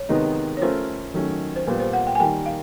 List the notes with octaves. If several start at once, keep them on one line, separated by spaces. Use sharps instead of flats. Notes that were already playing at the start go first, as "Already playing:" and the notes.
Already playing: C#5
C3 D#3 G#3 B3 D#4
C#5
A3 C#4 F4 A#4 C5
D#3 F#3 A3 C#4
C5
A#2 G3 B3 B4
C5
F#5
G5
G#5
D#3 G3 A#3 G5
F5